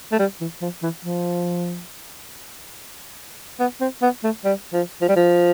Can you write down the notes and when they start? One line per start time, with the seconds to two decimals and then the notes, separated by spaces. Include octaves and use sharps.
0.12 A3
0.19 G3
0.41 E3
0.62 F3
0.83 E3
1.04 F3
3.60 B3
3.81 C4
4.02 B3
4.24 A3
4.45 G3
4.73 F3
5.01 F3
5.09 G3
5.16 F3